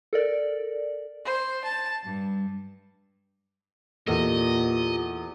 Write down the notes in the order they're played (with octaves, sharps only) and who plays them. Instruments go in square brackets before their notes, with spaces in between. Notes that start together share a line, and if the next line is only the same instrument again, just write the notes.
[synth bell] A4 A#4 D5
[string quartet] C5
A5
G2
[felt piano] E2 A4 [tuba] A#2 [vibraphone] F4 G4 [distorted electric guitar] D#5